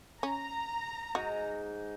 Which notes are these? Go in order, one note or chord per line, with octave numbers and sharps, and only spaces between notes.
C#4 A#5
G#2 D#4 F#4